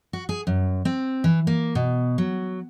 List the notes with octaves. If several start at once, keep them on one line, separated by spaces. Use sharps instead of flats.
F#4
G#4
F#2
C4
E3
A#3
B2
F#3